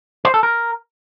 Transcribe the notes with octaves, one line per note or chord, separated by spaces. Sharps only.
C5
A4
A#4